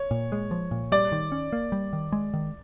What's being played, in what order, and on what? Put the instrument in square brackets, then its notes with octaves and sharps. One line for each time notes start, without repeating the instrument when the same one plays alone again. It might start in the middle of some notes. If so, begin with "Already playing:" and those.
Already playing: [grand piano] C#5
[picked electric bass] A#2
G#3
F3
A#2
[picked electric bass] G3 [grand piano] D5
[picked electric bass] D#3
C#4
A#3
G3
D#3
G#3
D#3